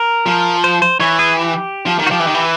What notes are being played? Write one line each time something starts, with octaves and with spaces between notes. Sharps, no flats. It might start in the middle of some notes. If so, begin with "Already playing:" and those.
Already playing: A#4
F3
C5
C5
E3 C#5
G#4
G4
F3
D#3
F#4
F3 G4
E3
D#3
E3